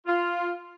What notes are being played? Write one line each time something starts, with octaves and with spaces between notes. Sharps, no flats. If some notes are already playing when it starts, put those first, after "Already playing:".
F4